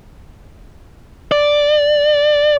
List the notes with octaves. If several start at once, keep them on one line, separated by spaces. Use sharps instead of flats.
D5